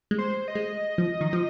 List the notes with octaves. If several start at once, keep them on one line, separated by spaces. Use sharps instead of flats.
G#3
C5
D#5
G#3
F3
D#3
F3